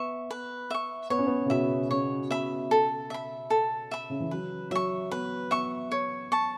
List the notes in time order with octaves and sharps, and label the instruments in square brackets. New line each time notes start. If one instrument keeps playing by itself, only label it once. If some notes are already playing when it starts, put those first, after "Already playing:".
Already playing: [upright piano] B3 [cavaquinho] E5 C#6
[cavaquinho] B4
E5 C#6
[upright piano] B3 [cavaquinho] C#5
[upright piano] C#4
B3
C#3
[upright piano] B2 [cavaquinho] E5 B5
[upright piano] C#3 [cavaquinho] C#5
[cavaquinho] E5 B5
A4
E5 B5
A4
E5 B5
[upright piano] C#3
E3
[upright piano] F#3 [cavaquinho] B4
[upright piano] F#3 [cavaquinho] E5 C#6
[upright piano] B3 [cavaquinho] B4
[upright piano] B3 [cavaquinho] E5 C#6
[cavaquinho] C#5
A5 C#6